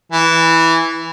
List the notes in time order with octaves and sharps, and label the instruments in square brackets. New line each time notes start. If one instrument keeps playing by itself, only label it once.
[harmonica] E3